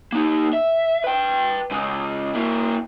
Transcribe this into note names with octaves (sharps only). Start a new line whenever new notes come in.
A#3 D#4
E5
B4 G5
C#3 G#3
A#3 E4